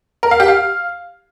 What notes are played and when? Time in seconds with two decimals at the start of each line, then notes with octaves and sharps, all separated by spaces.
0.23 A#4
0.31 F5
0.40 G4
0.48 F5